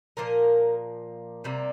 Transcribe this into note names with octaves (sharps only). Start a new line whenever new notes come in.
A#2 F3 A#3 A#4
C3 G3 A#3